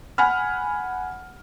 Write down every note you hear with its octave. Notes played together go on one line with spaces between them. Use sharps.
F#5 G#5 B5 F6